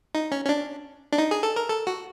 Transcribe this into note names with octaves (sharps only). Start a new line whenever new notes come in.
D#4
C#4
C#4
D4
D4
D#4
G#4
A4
A#4
A4
F#4